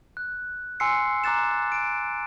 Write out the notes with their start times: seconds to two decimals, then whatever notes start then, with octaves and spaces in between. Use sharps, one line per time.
0.17 F#6
0.80 G#5 C6 E6 C7 C#7
1.24 A#5 D6 F#6 A6 E7
1.72 D7